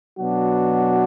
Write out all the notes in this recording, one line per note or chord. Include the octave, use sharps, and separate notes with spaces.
B2 F#3 B3 D4 F#4